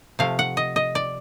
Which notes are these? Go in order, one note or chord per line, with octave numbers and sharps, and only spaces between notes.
C3 F3 A3 F5
F#5
D#5
D#5
D5